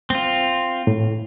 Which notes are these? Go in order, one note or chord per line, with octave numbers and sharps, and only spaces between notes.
C4 F4
A2